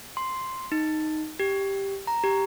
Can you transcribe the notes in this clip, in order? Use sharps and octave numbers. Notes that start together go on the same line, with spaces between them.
C6
D#4
G4
A#5
G4